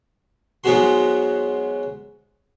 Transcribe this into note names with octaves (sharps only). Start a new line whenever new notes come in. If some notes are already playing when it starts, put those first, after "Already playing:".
G#2 F#3 G#3 B3 F#4 C6